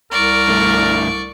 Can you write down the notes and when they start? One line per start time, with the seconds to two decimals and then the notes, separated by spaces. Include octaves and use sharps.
0.12 C2 A#4 D5 C#6
0.49 G2 A3